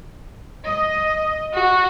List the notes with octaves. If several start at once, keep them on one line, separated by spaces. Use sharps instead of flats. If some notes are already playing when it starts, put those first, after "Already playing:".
D#5
F#4